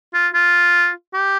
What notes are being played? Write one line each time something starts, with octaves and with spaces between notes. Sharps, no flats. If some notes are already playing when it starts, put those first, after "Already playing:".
F4
F4
G4